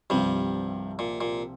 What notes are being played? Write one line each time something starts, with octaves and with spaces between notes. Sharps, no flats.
C2 G2 C3 F3 G3 C4 G4
A#2
A#2